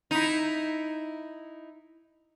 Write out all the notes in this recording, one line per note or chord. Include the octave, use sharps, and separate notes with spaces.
D#4 E4